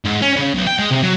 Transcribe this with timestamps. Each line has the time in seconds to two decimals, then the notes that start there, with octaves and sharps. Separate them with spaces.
0.05 G#2
0.22 C#4
0.36 C#3
0.54 B1
0.67 G5
0.79 G#3
0.91 C3
1.03 F#3